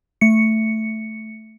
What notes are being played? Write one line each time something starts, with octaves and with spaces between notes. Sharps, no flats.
A3 C#7